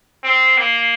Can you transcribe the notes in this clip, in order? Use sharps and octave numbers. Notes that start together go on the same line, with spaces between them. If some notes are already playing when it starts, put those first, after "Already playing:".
C4
A#3